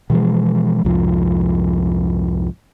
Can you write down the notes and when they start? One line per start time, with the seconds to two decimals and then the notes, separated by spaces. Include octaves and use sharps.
0.10 B2 E3 F3 G#3
0.85 C2 F2 G#2 F3